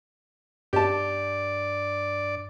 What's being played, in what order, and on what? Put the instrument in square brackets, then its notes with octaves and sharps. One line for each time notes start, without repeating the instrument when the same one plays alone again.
[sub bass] G2 [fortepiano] G4 A5 [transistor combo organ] D5